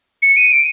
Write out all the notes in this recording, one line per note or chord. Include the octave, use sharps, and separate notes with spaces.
C#7
D#7
D7